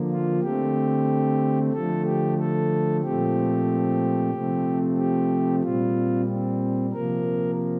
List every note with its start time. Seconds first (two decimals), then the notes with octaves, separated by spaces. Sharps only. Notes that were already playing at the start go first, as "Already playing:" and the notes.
Already playing: D3 F3 A#3
0.11 F4
0.42 D3 A3 C4 G4
1.73 D3 F3 A3 A4
2.05 G4
2.38 A4
3.03 A#2 F3 A3 C4 G4
4.32 C3 F3 A3 C4
4.97 G4
5.62 A#2 G3 C4 F4
6.28 C4
6.92 C3 F3 A#3 A#4